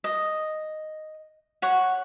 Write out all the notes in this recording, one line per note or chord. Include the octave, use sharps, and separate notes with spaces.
D#5
C#5 F#5